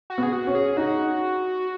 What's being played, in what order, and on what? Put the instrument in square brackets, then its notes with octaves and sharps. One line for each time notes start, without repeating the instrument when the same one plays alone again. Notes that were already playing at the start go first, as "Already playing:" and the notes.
[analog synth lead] F#4
[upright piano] B3 [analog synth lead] G#4
[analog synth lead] F#4
[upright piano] C#4
[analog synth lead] G#4
[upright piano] D#4 [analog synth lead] F#4